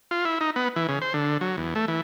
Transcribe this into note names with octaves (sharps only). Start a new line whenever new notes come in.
F4
E4
D#4
B3
E3
C#3
C5
D3
F#3
E2
A3
E3